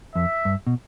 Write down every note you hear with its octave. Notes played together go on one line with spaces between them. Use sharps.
F2 E5
G2
B2